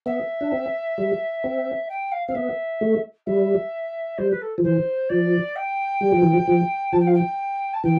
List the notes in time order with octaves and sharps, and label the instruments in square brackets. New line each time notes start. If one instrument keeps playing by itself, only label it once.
[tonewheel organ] B3 [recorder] E5
[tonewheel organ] D4
C4
G3
C4
[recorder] G5
F5
[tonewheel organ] C4 [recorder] F5
[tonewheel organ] B3 [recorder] E5
[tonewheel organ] A3
[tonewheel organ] G3 [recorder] E5
[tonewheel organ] G3 [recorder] C5
[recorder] B4
A4
[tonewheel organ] F3
[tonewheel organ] E3 [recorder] C5
[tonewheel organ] F3 [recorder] D5
[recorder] G5
[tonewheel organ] G3
F3
E3
F3
F3
[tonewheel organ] F3 [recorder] A5
[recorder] G5
F5
G5
A5
[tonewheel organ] E3 [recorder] G5